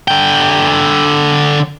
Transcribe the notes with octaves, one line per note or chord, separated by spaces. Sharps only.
D3 G5